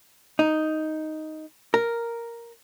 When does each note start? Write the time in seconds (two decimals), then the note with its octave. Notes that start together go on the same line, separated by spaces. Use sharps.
0.39 D#4
1.74 A#4